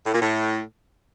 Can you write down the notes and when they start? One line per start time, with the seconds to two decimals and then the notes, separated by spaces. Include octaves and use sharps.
0.06 A2
0.14 A#2
0.21 A2